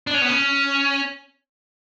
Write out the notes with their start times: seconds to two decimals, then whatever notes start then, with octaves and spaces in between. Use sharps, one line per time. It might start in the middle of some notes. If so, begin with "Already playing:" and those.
0.07 D4
0.14 C#4
0.22 B3
0.29 C#4